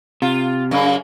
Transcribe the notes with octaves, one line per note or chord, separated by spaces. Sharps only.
C3 F4
F#2 C#3 A#3